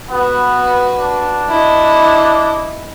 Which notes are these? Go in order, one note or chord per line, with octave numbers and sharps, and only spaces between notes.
B3 F#4 B4
D4
E4 D#5